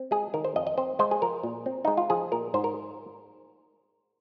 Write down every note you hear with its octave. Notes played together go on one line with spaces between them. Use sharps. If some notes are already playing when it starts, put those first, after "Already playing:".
Already playing: C4
G#3 G#4
D#3 A#4
C5
F2 D#5
D#5
C4 C5
G#3 C5
G#4
F3 A#4
A#2
C4
G#3 D#4
F4
F3 G#4
A#2 A#4
G#2 C5
A#4